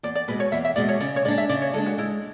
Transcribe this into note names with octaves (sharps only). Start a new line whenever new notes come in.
E2 D5
D5
B2 G#3 B4
C#5
E2 E5
E5
B2 G#3 D5
C#5
C#3 D5
C#5
G#3 D4 D5
E5
C#3 D5
C#5
G#3 D4 A4
F#4
G#3 E4